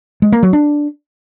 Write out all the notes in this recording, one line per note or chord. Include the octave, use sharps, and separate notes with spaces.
G#3
A#3
F#3
D4